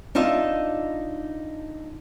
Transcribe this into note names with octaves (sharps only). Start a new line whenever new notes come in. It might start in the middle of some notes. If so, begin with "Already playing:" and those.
D4 D#4 F4 D#5 E5